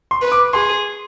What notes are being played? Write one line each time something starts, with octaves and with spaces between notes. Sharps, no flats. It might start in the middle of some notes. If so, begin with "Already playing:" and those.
C6
B4
D6
G#4 C6